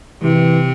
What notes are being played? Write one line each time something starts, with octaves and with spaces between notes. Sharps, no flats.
C3 E3